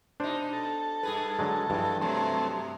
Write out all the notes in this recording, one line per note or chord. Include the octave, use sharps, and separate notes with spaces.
B2 D4 D#4 C5
A4
G2 G#4 B4
D3 F#3 G#3
G2 E3 F3
F#2 C3 F#3 A3 C4